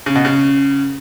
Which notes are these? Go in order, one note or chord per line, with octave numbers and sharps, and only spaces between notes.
C#3
B2
C#3